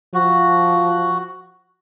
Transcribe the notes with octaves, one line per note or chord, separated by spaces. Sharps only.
F3 F#4